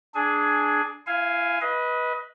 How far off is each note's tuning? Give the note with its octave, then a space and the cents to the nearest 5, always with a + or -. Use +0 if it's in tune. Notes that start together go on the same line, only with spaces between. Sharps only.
D4 +0 G#4 +15 G#5 +10
E4 +35 F5 +0 G#5 +0
B4 -10 D#5 +25